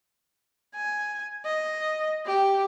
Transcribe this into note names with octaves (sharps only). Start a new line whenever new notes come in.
G#5
D#5
G4